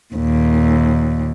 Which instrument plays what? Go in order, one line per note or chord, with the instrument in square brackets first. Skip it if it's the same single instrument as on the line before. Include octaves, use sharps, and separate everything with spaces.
[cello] D#2 A#2